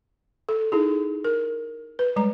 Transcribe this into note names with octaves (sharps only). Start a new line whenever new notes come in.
A4
D#4 E4 G#4
A#4
B4
G3 G#3 A#5